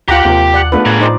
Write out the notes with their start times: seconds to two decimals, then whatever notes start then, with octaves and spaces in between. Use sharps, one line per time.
0.08 D2 F4 G4 F#5 G5 A#5
0.25 D#2 C3 F3 A#3
0.54 D5 F#5
0.72 A3 B3 D4 F4 B4
0.86 A2 G#4 A#4
1.00 F3 D#4 C5 D5